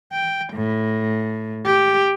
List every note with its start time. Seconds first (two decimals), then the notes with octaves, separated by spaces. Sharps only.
0.12 G5
0.53 A2
1.66 G4